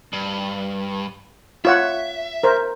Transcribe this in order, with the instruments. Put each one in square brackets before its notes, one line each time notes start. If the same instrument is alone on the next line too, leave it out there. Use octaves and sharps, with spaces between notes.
[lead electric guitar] G2
[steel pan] F4 C#5 F#5 [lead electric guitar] E5
[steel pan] A#4 C5